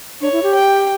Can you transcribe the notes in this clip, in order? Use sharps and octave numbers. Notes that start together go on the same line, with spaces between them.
D4 C#5
E4
G4
G5